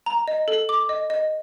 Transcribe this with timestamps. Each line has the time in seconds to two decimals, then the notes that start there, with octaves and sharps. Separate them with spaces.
0.06 A#5
0.28 D#5
0.48 A4
0.69 D6
0.89 D#5
1.10 D#5